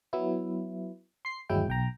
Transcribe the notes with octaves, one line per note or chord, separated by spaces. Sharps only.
F#3 B3 E4
C6 C7
G1 D#2 F#3 G#3 E4 G5
B1 G5 A#5